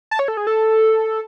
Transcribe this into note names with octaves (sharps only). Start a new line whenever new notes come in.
A5
C#5
A4
G#4
A4